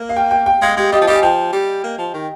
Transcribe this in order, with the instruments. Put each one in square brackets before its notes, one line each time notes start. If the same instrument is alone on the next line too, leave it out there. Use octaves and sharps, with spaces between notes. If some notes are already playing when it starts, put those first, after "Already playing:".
Already playing: [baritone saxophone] A#3
[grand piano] F5
G5
G5
G5
[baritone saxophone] G#3 [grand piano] F5
[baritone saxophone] G#3 [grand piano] G4
[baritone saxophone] G3 [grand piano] D#5
[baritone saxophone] F3
[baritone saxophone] G3 [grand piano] D#5
[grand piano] G#5
[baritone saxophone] F3 [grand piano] G5
[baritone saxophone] G3
A#3
F3
D#3